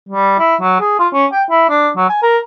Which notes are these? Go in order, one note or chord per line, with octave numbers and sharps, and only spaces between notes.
G3
E4
F#3
G#4
F4
C#4
G5
E4
D4
F#3
G#5
A#4